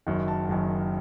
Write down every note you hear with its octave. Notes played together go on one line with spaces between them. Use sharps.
F#1 F#2 D#3
A5
F#1 F#2 D#3